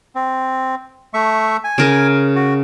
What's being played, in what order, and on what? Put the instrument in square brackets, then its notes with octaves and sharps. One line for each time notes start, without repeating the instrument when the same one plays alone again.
[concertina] C4
A3 E5 C#6
G#5
[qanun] C#3 A#4
[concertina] F#4